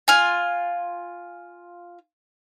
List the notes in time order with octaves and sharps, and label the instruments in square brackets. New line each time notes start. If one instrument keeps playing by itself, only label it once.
[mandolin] F4 G#5